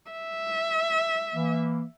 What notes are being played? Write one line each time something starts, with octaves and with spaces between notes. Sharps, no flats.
E5
E3 A#3